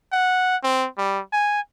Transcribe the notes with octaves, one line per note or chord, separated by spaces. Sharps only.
F#5
C4
G3
G#5